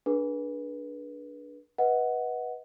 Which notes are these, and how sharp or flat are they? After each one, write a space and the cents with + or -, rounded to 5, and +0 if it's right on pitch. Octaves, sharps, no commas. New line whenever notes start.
D4 +0 G#4 +15 B4 -30
B4 -15 D#5 +35 F#5 +0